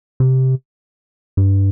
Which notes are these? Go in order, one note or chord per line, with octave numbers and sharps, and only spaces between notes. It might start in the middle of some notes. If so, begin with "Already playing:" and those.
C3
G2